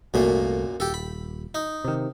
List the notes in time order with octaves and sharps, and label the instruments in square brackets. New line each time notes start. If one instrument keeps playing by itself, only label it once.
[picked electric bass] C2 A3 [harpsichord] F#2 A#2 A#3
[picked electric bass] D#1 [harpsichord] G4 A4
[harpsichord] B5
D#4
[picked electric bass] C3 D#3